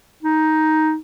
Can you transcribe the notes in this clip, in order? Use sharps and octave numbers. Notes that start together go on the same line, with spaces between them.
D#4